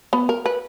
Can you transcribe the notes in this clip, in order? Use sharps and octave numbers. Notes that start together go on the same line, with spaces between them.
B3
A#4
B4